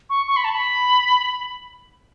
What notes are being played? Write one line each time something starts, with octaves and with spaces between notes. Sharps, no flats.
C#6
C#6
B5
A5
B5